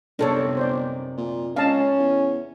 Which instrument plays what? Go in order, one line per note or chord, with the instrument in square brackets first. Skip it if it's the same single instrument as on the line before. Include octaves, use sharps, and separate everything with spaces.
[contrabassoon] G1 [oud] F#2 C3 D#3 [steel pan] D4 A4 C#5
[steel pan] C5 D5
[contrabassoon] A#2
[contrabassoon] C#2 [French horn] C#4 [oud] D#4 [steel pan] F5 A5
[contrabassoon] E2